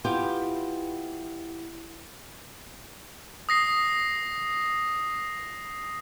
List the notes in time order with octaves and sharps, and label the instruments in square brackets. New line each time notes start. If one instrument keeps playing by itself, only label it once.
[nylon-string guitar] B3 E4 F4 G4 G5
[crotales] D#6 A#6 C7